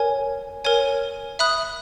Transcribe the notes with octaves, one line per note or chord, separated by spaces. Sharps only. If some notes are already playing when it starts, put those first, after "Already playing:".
Already playing: A#4 C#5 G#5
A#4 C#5 G#5
E5 B5 D#6 F#6